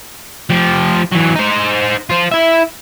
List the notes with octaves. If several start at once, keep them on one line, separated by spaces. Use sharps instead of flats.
F3 G4
E3 F#3
D#4 C5
F4 C5
E4 E5